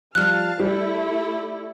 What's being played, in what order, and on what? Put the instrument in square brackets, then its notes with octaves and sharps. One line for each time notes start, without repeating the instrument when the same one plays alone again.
[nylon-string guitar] F3 G3 F4 [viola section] F5 A5 [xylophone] F6 F#6
[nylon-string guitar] G3 [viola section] A3 E4 A4 [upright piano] G4